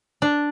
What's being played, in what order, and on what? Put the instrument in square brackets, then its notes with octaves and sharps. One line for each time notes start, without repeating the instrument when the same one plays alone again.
[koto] D4